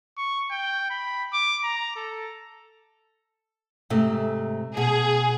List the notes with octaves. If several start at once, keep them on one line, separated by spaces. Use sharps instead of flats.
C#6
G5
B5
D6
A#5
A4
G#2 C3 A3
B2 G#4